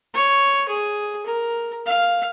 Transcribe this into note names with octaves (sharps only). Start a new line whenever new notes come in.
C#5
G#4
A#4
F5